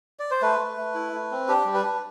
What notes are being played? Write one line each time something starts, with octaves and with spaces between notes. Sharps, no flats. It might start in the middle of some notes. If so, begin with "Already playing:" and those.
D5
C5
A3 B4
A3
A3
E4
A3
C4
D4 G4
G3
B4
D4